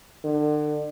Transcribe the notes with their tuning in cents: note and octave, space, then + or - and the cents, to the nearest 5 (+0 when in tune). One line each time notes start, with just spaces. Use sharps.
D3 +35